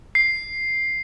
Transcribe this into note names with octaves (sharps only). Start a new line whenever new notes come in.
C7